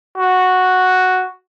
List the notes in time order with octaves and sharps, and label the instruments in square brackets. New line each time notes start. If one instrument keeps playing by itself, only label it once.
[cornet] F#4